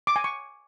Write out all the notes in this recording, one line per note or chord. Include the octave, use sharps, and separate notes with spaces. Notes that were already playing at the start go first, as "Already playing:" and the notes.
D6
G#5
C#6